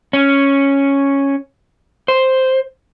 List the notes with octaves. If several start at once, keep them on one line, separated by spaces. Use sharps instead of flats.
C#4
C5